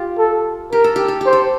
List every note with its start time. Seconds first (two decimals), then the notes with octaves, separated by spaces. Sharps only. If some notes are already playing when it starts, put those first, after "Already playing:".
Already playing: F4 G4
0.19 A4
0.72 G4 A#4
0.84 A4
0.96 G4
1.08 A4
1.21 G4
1.26 C5
1.33 A4